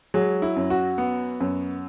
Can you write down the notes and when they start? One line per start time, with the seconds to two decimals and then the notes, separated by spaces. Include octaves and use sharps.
0.14 F#3 G#3 G#4
0.42 E4
0.56 F#2
0.70 F#4
0.98 B3
1.40 F#2